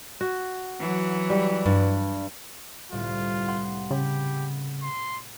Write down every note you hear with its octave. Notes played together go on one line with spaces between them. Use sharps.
F#4
E3 F#3
G3
G2
G1 C2 A2 F4
F5 F#5 C6
C#3 G4 B5
C6